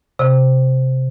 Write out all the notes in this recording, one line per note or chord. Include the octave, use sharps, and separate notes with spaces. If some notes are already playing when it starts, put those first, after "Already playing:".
C3